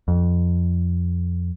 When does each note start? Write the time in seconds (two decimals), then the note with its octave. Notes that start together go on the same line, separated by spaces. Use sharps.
0.08 F2